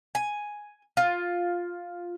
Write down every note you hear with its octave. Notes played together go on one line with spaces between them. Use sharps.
G#5
F4